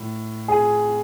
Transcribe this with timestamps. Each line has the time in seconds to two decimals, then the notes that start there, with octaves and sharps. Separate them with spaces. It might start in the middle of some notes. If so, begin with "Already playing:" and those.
Already playing: A2
0.48 G#4